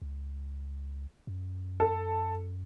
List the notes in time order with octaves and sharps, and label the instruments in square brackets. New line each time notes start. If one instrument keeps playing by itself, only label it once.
[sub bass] C#2
F#2
[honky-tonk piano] A4